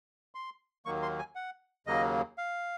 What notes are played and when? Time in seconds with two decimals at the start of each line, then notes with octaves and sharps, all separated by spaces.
0.35 C6
0.85 D#2 D#3 F#3 A#3 C#6
1.02 C6
1.19 G#5
1.35 F#5
1.87 D#2 C#3 F#3 A#3 D#5
2.38 F5